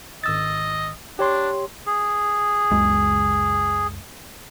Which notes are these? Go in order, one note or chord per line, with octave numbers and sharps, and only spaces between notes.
G#1 D#5 E6 A6
D4 G4 C#5 C6
G#4
F#1 C#2 G#3